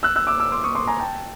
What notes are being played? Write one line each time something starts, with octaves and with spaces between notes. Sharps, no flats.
E6 F#6
E6 F#6
D6 E6
D6 E6
C6 D6
C#6 D#6
C6 D6
G#5 A#5
G5 A5